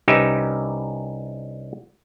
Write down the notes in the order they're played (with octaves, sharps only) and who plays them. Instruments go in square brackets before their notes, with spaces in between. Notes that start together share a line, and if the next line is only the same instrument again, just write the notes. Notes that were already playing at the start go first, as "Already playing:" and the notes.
[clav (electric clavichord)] C2 C#4 D#4 G4 B4 E5